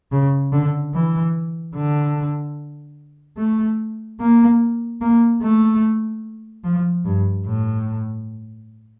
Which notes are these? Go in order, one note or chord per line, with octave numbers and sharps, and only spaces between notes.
C#3
D3
E3
D3
A3
A#3
A#3
A3
F3
G2
A2